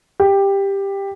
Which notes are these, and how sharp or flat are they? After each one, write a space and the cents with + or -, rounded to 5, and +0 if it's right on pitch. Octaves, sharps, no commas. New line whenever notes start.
G4 +10